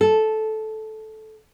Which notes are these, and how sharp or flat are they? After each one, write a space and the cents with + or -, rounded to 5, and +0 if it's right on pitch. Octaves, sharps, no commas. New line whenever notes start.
A4 -10